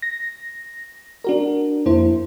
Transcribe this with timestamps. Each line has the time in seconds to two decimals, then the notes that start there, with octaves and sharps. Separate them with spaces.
0.02 A#6
1.24 D4 F#4 A#4
1.86 F2 A#3 E4 C5